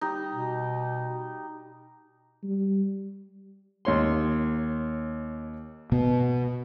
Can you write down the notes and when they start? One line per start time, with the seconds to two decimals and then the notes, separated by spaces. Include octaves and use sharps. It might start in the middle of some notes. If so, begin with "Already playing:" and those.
0.01 G3 D#4
0.31 B2
2.43 G3
3.85 D#2 C#5 C6
5.92 B2 B3